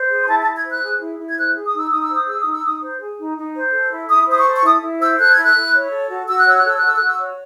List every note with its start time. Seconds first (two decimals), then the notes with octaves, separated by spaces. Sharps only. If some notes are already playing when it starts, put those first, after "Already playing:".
Already playing: C5
0.10 G#4
0.23 C6
0.28 E4 A5
0.42 A5
0.46 E4
0.55 G#6
0.64 C5 F#6
0.82 G#4
1.01 E4
1.19 E4
1.27 G#6
1.37 C5 F#6
1.55 G#4
1.64 D#6
1.73 D#4 E6
1.89 D#4 D#6
2.01 E6
2.10 C5 D#6
2.27 G#4 E6
2.40 D#6
2.46 D#4
2.52 E6
2.64 D#4 D#6
2.82 C5
3.00 G#4
3.19 D#4
3.37 D#4
3.55 C5
3.73 A4
3.92 E4
4.09 E4 D#6
4.28 C5 D#6
4.37 C#6
4.46 A4
4.55 C#6
4.64 E4 D#6
4.82 E4
5.00 C5 E6
5.18 A4 F#6
5.31 G#6
5.37 E4
5.44 F#6
5.55 E4
5.73 C#5
5.91 A4
6.09 F#4
6.28 F#4 E6
6.37 F#6
6.46 C#5 E6
6.57 F#6
6.64 A4 E6
6.77 F#6
6.82 F#4 E6
6.97 F#4 F#6
7.07 E6
7.19 C#5